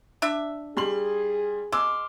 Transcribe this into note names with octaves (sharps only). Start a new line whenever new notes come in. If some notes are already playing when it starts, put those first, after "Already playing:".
D4 E5
G3 G#4 C6 F#7
G#3 C6 D6 E6 F6